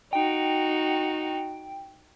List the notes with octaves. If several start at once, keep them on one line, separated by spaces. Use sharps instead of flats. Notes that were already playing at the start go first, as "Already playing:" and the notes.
D#4 F#4 G5